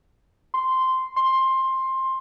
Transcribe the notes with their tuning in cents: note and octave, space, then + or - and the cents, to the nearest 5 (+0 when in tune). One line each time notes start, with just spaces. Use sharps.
C6 -10
C6 +15